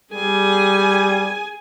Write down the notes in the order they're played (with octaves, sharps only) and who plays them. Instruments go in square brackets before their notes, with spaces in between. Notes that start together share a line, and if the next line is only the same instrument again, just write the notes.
[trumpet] G3 [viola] G#4 G#5